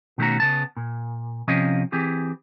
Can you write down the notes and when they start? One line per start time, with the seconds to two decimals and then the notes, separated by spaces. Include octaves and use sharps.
0.18 B2 D#3 A3 C#4 F#4 A#5
0.40 C#3 B3 A5
0.77 A#2
1.48 C3 F3 C#4 D#5 F5
1.92 E3 C4 G4 G#4